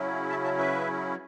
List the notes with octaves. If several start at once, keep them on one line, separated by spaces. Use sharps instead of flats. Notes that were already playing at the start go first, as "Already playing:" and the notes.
Already playing: C#3 F#3 C#4 E4
E5 A5
E5 A5
B4 E5